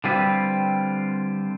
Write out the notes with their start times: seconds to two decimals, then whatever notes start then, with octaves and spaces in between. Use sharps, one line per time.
0.04 D3 G3 C4 F4 B4